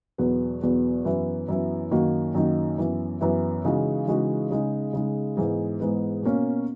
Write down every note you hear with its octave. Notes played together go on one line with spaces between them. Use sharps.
E2 B2 F#3 B3
E2 B2 F#3 B3
F#2 E3 B3 E4
F#2 E3 B3 E4
F#2 D#3 A#3 D#4 F#4
F#2 D#3 A#3 D#4 F#4
F#2 E3 B3 E4
F#2 E3 B3 E4
C#3 E3 G#3 D#4 F#4
C#3 E3 G#3 D#4 F#4
C#3 G#3 D#4
C#3 G#3 D#4
G#2 E3 G#3 B3
G#2 E3 G#3 B3
B2 A#3 C#4